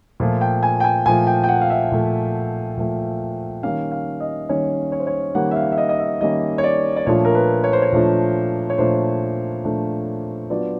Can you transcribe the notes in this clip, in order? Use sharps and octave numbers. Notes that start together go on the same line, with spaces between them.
A#2 F3 A3
G5
G#5
G5
G#5
A#2 F3 A3 G#5
G5
G5
F#5
F5
E5
A#2 F3 A3
A#2 F3 A3
D#3 G3 A#3 C#4 F5
F5
D#5
D#3 G3 A#3 C#4 C#5
C#5
C5
C#5
D#3 G3 A#3 C#4 F#5
E5
F5
E5
D#5
D#5
E5
D#3 G3 A#3 C#4 D#5
C#5
D5
D5
A#2 F3 A3 D4 F4 C#5
A#4
B4
C#5
C5
C#5
A#2 F3 A3 D4 F4
C#5
A#2 F3 A3 D4 F4 C5
A#2 F3 A3 D4 F4
F#3 B3 D4 F4 D5